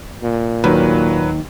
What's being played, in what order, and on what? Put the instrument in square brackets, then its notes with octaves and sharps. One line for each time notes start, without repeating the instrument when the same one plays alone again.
[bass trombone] A#2
[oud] D#2 [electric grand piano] F#3 B4